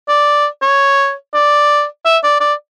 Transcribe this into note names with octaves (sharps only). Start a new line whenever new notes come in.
D5
C#5
D5
E5
D5
D5